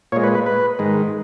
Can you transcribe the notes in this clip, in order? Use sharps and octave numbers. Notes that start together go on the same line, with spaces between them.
A#2 G#3 C#5
B4
B4
B4
G#2 D#3 G#3